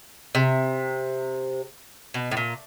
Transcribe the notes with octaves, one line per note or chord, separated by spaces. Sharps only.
C3
B2
A2
A#2